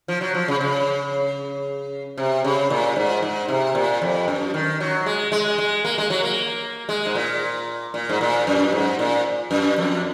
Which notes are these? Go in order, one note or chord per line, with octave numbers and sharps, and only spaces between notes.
F3
F#3
F3
C#3
C#3
C3
C#3
A#2
G#2
G#2
C3
A#2
F2
F#2
D#3
F#3
G#3
G#3
G#3
A#3
G#3
F#3
A#3
G#3
G#2
A#2
A#2
G#2
A#2
F#2
G#2
A#2
F#2
F2